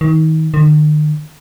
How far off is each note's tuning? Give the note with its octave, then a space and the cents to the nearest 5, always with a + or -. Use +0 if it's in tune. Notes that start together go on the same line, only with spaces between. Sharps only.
D#3 +30
D#3 -45